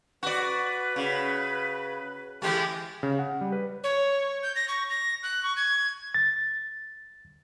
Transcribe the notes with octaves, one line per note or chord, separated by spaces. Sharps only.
F#4 B4 D5
C#3
E3 G#3 A3 G4
C#3
F#5
G3
B4
C#5
G6
A#6
C#6
A#6
F#6
C#6
G#6
A6